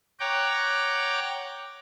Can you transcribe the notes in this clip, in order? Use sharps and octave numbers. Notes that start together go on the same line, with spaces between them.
C#5 F#5 G5 A#5 D6